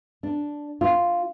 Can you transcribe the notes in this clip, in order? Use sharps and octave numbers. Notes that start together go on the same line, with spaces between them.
D4
F4